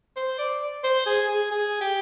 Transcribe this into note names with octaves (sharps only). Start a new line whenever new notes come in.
C5
D5
C5
G#4
G#4
G#4
G4